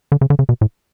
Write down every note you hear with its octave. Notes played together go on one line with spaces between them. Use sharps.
D3
C#3
D3
C#3
B2
A2